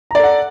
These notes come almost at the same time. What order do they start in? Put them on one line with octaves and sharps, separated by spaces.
A#5 D5 A4 F#5